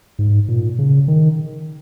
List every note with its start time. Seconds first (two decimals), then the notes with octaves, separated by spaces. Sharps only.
0.19 G#2
0.48 A#2
0.79 C#3
1.08 D#3